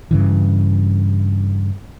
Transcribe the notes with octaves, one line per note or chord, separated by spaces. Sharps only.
G2 C#3 E3